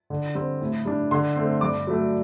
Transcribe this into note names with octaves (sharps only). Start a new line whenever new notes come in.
D3
G3 C4
A2
G3 D4
D3 C6
A3 C4
G2 D6
F#3 A3